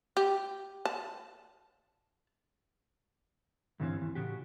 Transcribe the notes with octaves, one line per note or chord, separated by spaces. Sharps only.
G4
A5
D2 G2 E3 C4 C#4
D#2 E3
A2 C#3 F#4 G4